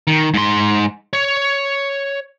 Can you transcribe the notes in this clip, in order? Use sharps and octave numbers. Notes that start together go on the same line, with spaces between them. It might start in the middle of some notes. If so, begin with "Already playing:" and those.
D#3
G#2 C6
C#5